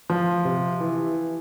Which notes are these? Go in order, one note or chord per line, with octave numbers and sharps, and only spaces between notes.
F3
C3
E3